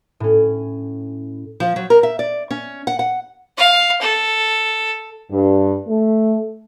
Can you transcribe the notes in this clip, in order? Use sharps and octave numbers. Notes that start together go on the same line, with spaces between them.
A2 C#4
F3
F#3
A#4
E5
D5
C#4
F#5
F#5
F5
A4
G2
A3